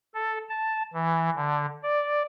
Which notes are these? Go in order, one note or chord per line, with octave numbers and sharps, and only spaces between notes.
A4
A5
E3
D3
D5